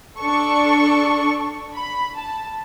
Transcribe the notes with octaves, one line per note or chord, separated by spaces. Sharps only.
D4 A4 C#6
B5
A5